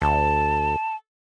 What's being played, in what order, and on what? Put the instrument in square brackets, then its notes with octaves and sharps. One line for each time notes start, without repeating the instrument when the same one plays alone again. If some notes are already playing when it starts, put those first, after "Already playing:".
[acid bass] D2 [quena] A5